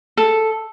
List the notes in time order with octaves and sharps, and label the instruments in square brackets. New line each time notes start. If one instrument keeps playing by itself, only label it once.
[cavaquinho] A4